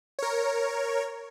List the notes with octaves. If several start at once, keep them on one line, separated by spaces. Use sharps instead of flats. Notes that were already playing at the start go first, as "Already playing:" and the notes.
A#4 C#5